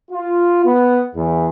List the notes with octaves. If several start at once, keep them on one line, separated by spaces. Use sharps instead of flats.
F4
B3
E2